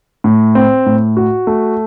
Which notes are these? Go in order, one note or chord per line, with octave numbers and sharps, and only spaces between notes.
A2
C4
A2
F#4
A3